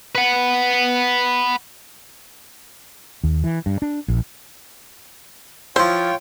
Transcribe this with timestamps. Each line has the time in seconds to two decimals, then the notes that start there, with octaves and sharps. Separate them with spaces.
0.15 B4 F#5
3.24 D#2
3.44 E3
3.66 G2
3.82 D4
4.08 A#1
5.76 F3 E4 F4 C5 C#5 G5